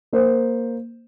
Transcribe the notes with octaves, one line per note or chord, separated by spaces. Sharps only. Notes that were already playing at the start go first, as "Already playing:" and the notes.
A#3 C5